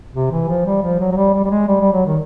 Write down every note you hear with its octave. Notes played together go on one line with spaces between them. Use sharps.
C3
E3
F3
G3
F3
F#3
F#3
G3
G3
G3
G#3
G3
G3
F#3
D#3